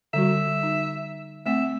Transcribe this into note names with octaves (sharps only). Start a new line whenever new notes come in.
D3 G3 F#4 E5
D#4
A3 C4 E5 F#5